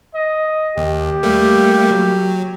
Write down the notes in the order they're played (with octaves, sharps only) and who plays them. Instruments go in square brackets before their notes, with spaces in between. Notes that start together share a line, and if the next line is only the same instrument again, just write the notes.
[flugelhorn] D#5
[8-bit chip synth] D#2 [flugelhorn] G4
[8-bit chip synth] G3 A3 A#3
F#3